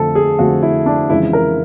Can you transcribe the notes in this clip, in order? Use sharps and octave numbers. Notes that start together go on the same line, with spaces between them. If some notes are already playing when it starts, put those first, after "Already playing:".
Already playing: F2 D3 F3 A3 A4
G#4
F2 D3 F3 A3 F#4
E4
D4
F2 C#3 E3 G#3 E4
A#4